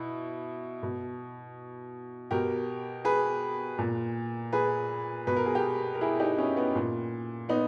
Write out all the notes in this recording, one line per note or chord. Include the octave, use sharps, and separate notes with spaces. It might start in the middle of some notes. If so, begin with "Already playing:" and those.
Already playing: B2 E4
B2
B2 G4 A#4
G#4 B4
A#2
G#4 B4
B2 B4
A#4
G#4
G4 A#4
A#4
E4 G#4
D#4 G4
C#4 E4
B3
A#2
B3 D#4